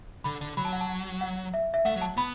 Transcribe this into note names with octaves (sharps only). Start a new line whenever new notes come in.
D3 B5
D3
F#3 B5
A5
F#5
A5
F#5
E5
E5
A3 F#5
F#3
A5
B3 B5